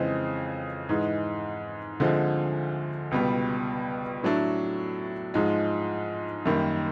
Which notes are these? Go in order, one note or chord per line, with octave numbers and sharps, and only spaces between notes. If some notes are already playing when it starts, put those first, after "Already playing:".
Already playing: F2 C#3 E3 G#3 C4
G#2 E3 G#3
D2 D3 F3 G#3 C4
C#2 B2 G3 B3
A2 F#3 A3 D4
G#2 F3 G#3
F#2 D#3 G3 A#3